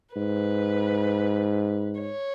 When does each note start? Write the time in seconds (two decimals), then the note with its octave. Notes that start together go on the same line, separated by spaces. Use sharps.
0.16 G#2 B4
2.01 C#5